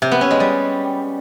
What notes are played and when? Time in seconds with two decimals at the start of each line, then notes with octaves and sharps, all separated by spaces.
0.02 C3
0.11 B3
0.21 C#4
0.31 G#3
0.40 G3